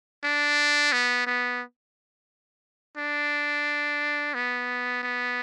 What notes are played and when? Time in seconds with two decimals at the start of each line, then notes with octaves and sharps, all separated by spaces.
0.24 D4
0.92 B3
1.27 B3
2.97 D4
4.34 B3
5.03 B3